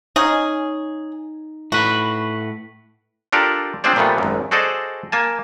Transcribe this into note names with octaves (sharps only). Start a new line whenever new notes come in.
C#4 D#4 G#4
A2 F#4 B4
D4 F4 G4 A4 A#4 D5
C4 D4 F4 G#4 C5 D5
A#2 F3 G3 A3 B3
G#1 F#2
F#4 G#4 A4 C5 D5 D#5
A#3 G#5 A5